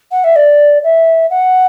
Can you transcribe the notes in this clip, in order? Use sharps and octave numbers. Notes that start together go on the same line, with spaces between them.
F#5
E5
D5
E5
F#5